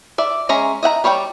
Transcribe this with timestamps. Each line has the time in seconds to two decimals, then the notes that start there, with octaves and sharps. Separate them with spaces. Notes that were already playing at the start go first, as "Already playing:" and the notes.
0.18 D5 E5
0.49 G#3 C#4 E5 A#5
0.83 D#5 E5 F#5 A#5
1.04 G3 C#5 D5 E5 G5